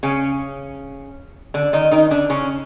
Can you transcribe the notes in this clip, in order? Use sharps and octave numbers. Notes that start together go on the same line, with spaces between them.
C#3 C#4
D3 D4
D#3 D#4
D#3 D#4
D3 D4
C#3 C#4